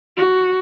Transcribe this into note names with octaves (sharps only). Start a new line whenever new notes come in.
F#4